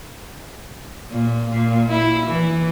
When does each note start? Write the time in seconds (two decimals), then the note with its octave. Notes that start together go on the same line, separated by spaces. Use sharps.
1.11 A#2
1.50 A#2
1.89 E4
2.26 E3